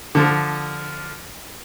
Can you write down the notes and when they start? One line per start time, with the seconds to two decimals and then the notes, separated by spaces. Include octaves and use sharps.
0.15 D3 F3